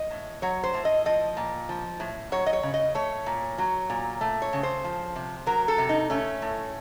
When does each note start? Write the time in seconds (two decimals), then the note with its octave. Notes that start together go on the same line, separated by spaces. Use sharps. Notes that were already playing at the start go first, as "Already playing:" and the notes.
Already playing: D#5
0.11 A2
0.42 F#3 C#5
0.64 C5
0.74 A2
0.85 D#5
1.05 F3 D#5
1.37 A#2
1.69 F3
2.00 A2
2.32 F#3 C#5
2.46 D#5
2.53 C#5
2.63 C#3
2.74 D#5
2.95 A3 C#5
3.26 A#2
3.58 F#3
3.90 A#2
4.21 A3
4.42 C#5
4.53 C#3
4.63 C5
4.84 F3
5.16 C3
5.47 F#3 A#4
5.68 A4
5.78 C3
5.89 D#4
6.10 A3 C#4
6.42 A2